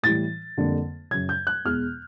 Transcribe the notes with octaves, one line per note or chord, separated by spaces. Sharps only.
A2 E3 G3 A6
F2 D3 G3 A#3
F#2 C#3 F#3 G#6
G6
F#6
E2 B2 G#3 F6